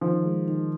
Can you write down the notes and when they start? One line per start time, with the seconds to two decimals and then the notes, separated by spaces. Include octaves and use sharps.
0.01 D#3 F3
0.25 G#3
0.48 D#3